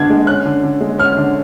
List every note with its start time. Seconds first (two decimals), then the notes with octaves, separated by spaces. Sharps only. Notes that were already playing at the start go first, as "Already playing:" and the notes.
Already playing: D3 G#3 B3 D4 G#6
0.10 G#3
0.27 C#4 F#6
0.45 D3
0.63 D3
0.81 G#3
0.98 C#4 F6
1.17 D3